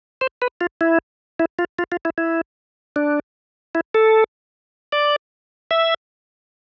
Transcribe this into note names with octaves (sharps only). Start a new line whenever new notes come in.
C5
B4
F4
E4
E4
F4
F4
F4
E4
E4
D4
E4
A4
D5
E5